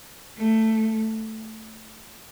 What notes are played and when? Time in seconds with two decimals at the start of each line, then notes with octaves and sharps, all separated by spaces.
0.37 A3